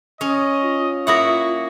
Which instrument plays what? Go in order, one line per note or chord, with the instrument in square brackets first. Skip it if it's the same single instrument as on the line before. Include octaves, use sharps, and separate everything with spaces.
[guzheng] C#4 [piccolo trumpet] D#5
[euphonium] F4
[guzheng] A#3 E4 F#5 [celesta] E5 D#6 A#6 [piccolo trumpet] C#6